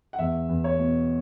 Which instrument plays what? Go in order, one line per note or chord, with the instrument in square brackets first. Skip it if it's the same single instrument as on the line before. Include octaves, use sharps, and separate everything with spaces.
[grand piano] F#5
E2 E5
E2
C#5
B2